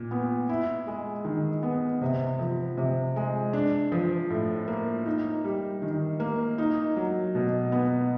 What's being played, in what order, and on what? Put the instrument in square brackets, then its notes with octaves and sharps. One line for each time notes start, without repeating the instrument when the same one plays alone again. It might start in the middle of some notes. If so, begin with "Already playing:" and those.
Already playing: [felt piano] A#2
B3
E4
G#3
D#3
B3
C3
F3
C3
G#3
D4
F3
A2
A#3
D#4
G3
D#3
A#3
D#4
F#3
B2
B3